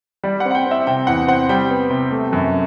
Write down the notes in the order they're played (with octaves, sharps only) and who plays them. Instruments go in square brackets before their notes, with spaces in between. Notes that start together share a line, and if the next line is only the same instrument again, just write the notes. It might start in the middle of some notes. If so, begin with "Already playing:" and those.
[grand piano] G3 D5
F#5
C4
F#5
G5
C4
E5
C3 G5
E2 F#5
C4 F#5
G3 G5
B3
C3
A3
F#2